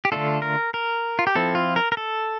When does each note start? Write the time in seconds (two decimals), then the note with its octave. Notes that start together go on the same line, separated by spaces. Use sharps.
0.05 G4
0.12 D3 A3 D4 F4 A4
0.42 A#4
0.74 A#4
1.19 F4
1.27 G4
1.35 F3 C4 E4 A4
1.55 F4
1.76 A#4
1.92 A#4
1.97 A4